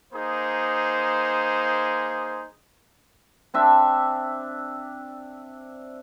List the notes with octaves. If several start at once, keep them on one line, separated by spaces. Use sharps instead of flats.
A#3 D#4 G#4 C5
C4 D4 E5